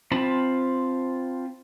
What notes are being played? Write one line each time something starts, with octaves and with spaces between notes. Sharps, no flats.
C4 F4 A5 B5